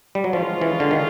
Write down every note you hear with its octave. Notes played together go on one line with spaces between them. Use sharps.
G3
F#3
F3 G#3 C#4 F4
E3
D3
D#3